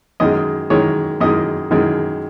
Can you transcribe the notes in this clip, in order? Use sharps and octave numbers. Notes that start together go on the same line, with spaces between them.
F#2 D#3 G#3 D#5
F#2 D#3 G#3 C#5
F#2 D#3 G#3 D#5
F#2 D#3 G#3